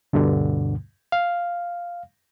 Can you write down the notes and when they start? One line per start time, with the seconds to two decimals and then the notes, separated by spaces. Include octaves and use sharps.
0.13 D2 G2 B2 D3
1.12 F5